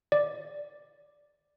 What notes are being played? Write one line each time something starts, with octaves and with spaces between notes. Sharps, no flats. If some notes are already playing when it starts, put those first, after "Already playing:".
D5